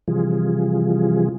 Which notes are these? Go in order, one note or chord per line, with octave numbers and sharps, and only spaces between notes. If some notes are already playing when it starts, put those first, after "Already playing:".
C3 E3 F3 G3 F4 G#4